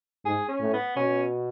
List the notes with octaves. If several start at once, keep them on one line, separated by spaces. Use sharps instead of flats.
G#2 G#4
C#4
A2
B3
B2 C#4